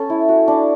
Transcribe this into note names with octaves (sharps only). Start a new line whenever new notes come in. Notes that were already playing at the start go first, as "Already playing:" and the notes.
Already playing: C#4 A4
E4
F#4
D4